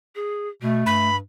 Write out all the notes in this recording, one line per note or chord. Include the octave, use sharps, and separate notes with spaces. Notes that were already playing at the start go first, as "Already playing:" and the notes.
G#4
B2 A3
G2 B5